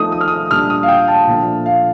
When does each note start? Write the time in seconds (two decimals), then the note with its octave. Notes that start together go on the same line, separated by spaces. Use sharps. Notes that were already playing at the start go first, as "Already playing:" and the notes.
Already playing: F3 A3 D#4 D#6
0.12 D#6
0.21 F6
0.28 D#6
0.50 A#2 G3 D4 F6
0.70 D#6
0.83 F5
0.88 G5
1.08 A5
1.27 A#2 F3 A3 D4
1.66 F5